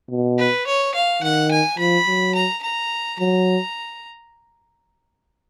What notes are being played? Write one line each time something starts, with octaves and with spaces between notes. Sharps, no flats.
B2
B4
C#5
F5
D#3 F#5
G#5
F3 B5
F#3
A#5
A#5
F#3 A#5